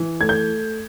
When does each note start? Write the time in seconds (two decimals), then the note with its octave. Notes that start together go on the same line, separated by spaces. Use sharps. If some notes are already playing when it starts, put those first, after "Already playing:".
Already playing: E3
0.21 A3 G#6
0.29 G6